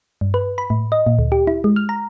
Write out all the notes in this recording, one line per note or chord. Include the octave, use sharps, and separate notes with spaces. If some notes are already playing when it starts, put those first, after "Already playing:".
G2
B4
B5
A2
D#5
A#2
D2
G4
E4
G#3
F6
A#5